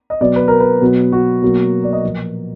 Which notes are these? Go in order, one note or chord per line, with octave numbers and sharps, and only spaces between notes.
D#5
B2 F#3 B3 D5
B4
A#4
B4
B2 F#3 B3
F#4
B2 F#3 A#3
D5
D#5
A#2 F3 A#3